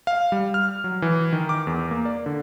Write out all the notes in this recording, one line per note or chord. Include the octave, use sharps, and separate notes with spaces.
F5
G3
F6
F#3
E3
D#3
D6
E2
A#3
D5
D3